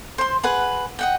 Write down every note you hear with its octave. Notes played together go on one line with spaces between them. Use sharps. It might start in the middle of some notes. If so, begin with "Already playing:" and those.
C5 C6
G#4 B4 F#5
D#5 F#5 G5